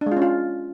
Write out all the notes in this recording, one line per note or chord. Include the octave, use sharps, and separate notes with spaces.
D4
G#3
F4
C#4
F4